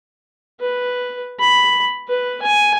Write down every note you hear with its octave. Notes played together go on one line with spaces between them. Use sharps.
B4
B5
B4
G#5